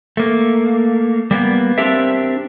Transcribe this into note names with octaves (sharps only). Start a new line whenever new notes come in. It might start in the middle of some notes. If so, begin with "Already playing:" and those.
A3 A#3
G3 A#3 B3
C4 D4 G4 A#4 E5